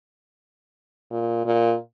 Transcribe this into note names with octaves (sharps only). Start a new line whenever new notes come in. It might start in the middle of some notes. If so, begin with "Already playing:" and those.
A#2
A#2